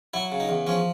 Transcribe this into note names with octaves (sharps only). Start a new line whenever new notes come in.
F#3 E4
C#3
D#4
E2
F3 C#4